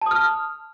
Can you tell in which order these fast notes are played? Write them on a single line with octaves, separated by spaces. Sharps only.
A5 D#6 F6